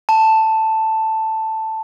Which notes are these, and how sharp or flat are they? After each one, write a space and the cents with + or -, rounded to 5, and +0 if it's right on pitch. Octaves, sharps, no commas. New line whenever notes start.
A5 +5